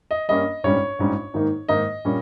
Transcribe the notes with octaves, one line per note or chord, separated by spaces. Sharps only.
D#5
G2 G3 A#3 C#4 D#5
A#1 G#2 G3 C#4 C#5
A#1 G#2 G3 C#4
G#2 D#3 A#3 D#4
G#2 D#3 A#3 D#4 D#5
A#2 G3 C#4